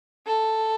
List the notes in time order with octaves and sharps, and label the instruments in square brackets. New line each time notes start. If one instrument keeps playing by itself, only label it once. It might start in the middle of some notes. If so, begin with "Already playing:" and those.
[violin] A4